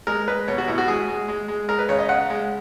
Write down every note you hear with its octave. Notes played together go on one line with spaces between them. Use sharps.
G#3 A#4
G#3 B4
B2 C#5
F#4
B2 E4
F#4
G#3 G#4
G#3
G#3
G#3
G#3 A#4
B4
C#3 C#5
D#5
C#3 F#5
G#3